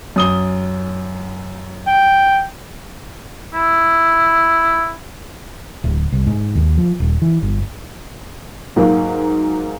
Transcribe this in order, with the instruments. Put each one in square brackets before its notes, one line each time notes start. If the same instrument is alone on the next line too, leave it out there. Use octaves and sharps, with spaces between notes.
[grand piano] F#2 D#6 G7
[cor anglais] G5
[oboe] E4
[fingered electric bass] D1
C2
G#2
D#2
F3
D#1
E3
G1
[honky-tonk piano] G#2 F#3 A#3